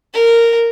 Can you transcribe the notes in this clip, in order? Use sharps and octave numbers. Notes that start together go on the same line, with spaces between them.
A#4